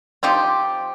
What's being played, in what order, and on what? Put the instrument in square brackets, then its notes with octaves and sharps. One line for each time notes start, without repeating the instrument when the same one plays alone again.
[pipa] F3 C4 D#4 G4